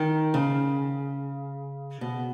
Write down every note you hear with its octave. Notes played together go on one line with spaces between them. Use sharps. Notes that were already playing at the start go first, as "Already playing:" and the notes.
Already playing: D#3
C#3
B2